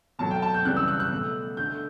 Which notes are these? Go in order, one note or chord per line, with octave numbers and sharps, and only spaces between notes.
B2 F#3 A3 A5
G5
A5
G6
C#3 E3 G3 F#6
E6
F#6
F#6
B2 A3
D3 A3 G6